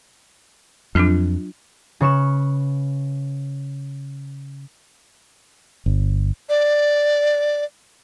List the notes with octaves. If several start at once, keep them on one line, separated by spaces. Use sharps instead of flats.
F2 F#3 D4 F4
C#3 B4 C#6 C#7 E7
G1
D5